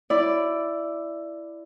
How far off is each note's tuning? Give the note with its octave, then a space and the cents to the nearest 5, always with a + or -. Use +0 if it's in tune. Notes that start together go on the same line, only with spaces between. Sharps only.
E4 +10 D5 +0